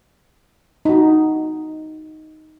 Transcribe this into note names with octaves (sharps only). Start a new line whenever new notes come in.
D#4 F#4